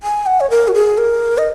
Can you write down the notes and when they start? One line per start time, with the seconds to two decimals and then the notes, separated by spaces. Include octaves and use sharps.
0.03 G#5
0.26 F#5
0.40 C#5
0.50 A#4
0.68 F#4
0.74 G#4
0.98 A#4
1.38 D#5